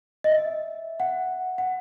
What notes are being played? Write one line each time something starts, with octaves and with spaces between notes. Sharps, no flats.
D#5
E5
F#5
F#5